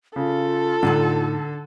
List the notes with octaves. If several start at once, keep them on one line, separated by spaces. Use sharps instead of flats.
C#3 F4 A4
A2 D3 D#4 F#5